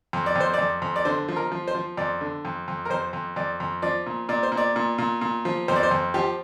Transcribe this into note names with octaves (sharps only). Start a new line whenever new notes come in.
F2
D5
F2
C5
F2 D5
F2
D5
D3 C5
F3
A#4
F3
C5
F3
F2 D5
D3
F2
F2
A#4
F2 C5
F2
F2 D5
F2
F3 D5
A#2
A#2 D5
C5
A#2
D5
A#2
A#2
A#2
F3
F2 C5
D5
C5
F2
F3 G4